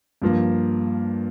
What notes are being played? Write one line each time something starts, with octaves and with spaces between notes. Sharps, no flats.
G2 F3 A#3